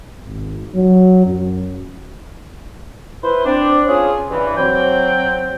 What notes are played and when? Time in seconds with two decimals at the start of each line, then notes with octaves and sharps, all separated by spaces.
0.23 G#1
0.75 F#3
1.25 F#2
3.22 E4 B4 C5
3.44 C4 D4
3.87 C#4 F4 G#4
4.30 G2 E3
4.57 F#3 C4 G5